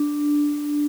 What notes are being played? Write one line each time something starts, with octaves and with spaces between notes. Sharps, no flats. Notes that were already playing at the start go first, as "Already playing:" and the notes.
Already playing: D4